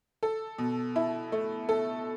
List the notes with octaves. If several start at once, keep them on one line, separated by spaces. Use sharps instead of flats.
A4
B2
E4
A3
A4